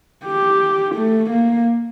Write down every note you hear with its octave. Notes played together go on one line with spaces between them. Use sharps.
G4
A3
A#3